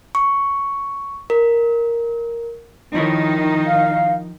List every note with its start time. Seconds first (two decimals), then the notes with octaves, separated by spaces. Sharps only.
0.15 C#6
1.30 A#4
2.95 D#3 F3 D#4 E4 C#5
3.67 F5